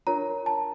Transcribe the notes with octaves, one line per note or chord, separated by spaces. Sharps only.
D4 F4 A#4 C#5 A#5
A5